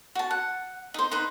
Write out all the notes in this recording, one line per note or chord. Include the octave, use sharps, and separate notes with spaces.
F#4 A5
F#5
D#4 C5
D#4 B4 C5